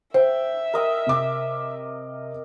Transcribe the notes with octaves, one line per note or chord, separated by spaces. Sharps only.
C5 E5 G5
A#4 D#5 G5
C3 D6